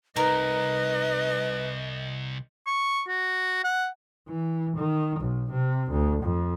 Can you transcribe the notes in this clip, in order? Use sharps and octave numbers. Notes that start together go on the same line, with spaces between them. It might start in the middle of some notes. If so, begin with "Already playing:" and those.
C2 D#4 A#4 B4 D#5
C#6
F#4
F#5
E3
D#3
B1
C3
D2
F2